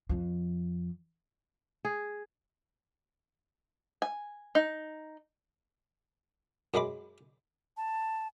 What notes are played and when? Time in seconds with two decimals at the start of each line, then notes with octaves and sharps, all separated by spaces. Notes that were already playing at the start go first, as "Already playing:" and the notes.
0.09 F2 F3
1.85 G#4
4.02 G#5
4.55 D#4
6.74 F#2 F#3 G#3 B5 D6
7.77 A5